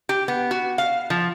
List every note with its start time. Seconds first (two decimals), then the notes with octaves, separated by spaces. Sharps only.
0.09 G4
0.28 B3
0.51 F#4
0.78 F5
1.10 F3